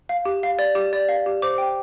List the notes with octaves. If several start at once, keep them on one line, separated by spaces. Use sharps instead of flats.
F5
G4
F5
D5
G4
D5
F5
G4
C5 D6
G5